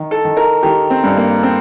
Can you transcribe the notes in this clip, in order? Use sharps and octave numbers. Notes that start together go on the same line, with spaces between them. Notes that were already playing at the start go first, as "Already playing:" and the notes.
Already playing: D#3
A4
D#3
A#4
D#3 G4
C4
G2
A#3
C4